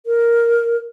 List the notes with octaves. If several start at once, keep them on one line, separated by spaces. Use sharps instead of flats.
A#4